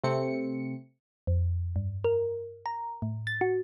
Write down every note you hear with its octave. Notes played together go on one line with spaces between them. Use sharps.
C3 A3 C4 C#7
F2
G2
A#4
A#5
A2
A6
F#4